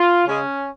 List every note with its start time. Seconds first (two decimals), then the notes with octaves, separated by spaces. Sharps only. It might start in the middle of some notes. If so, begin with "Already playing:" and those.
Already playing: F4
0.26 C#3 G#3 C#4